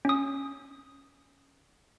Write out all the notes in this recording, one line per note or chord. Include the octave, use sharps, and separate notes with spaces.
C#4 D#6